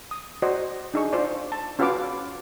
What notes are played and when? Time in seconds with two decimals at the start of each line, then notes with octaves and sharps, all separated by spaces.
0.11 D#6
0.42 F#4 C5 D5 D#5
0.94 D4 D#4 G#4 C#6
1.13 F4 C5 D5
1.52 A5
1.79 C#4 F4 F#4 B4 F5 D6